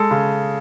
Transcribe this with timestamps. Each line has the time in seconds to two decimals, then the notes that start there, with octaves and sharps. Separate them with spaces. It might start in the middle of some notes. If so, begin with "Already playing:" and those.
Already playing: G#3 A4
0.11 C#3